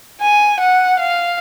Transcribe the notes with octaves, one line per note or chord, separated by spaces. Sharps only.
G#5
F#5
F5